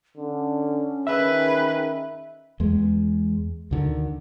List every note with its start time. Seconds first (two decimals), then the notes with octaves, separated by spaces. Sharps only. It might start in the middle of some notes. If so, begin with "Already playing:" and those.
0.17 D3 C#4
1.07 D#3 G#4 B4 E5
2.60 E2 G#3
3.71 D2 D3 D#3